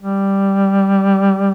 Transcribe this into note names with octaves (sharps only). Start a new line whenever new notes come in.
G3